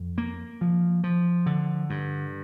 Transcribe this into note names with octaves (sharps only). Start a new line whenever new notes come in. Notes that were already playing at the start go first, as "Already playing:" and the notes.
Already playing: F2
A#3
F3
F3
D3
G2